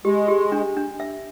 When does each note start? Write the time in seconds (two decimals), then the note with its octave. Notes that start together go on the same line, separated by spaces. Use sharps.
0.05 G#3 G4
0.28 G4
0.52 D4
0.77 D4
1.00 E5